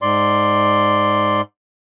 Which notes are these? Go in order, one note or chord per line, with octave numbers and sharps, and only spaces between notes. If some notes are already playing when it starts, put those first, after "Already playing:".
G#2 D5 C6